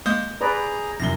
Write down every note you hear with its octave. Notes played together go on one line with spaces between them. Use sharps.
G#3 A#3 D#6 G6
G#4 B4 D5 A#5
C2 F#2 A#6 G7